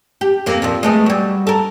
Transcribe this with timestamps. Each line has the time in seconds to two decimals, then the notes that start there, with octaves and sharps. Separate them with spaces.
0.21 G4
0.46 F2 A#3
0.62 F2 A#2 F3
0.83 G#3 A3 B3
1.06 F#3 G3
1.47 A4 A#4